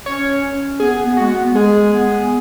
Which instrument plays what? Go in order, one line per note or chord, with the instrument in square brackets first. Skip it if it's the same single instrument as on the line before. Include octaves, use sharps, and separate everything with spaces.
[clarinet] C#4 [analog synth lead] C#5
[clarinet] C#4
[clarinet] B3 [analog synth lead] G#4
[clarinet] B3
[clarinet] G#3 [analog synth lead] F#4
[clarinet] B3
B3
[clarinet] G#3 [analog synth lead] G#4
[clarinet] B3